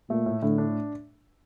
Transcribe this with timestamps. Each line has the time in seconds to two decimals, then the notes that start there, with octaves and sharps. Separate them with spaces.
0.10 A#2 A3
0.26 A2
0.42 A2 D3
0.58 D4